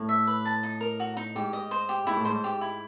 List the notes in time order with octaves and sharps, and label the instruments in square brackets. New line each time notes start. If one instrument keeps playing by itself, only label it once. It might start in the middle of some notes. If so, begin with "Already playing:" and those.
Already playing: [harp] A2
[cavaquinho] E5
B4
A5
D#4
A#4
F#4
D#4
[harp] G#2 [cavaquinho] G4
[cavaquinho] D#5
C5
G4
[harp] G#2 [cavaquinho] E4
[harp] A2
[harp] G#2 [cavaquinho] C5
[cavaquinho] G4
E4